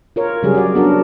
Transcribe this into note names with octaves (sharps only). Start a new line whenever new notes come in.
F4 A#4 C#5
C#3 F#3 G3 G4 G#4
F#4 D5
B3 C#4 D4 F#4 A4 A#4